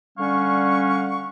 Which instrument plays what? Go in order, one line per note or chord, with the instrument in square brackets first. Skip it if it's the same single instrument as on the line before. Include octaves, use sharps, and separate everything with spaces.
[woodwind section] D3 G3 C#4 F5 F#5 C#6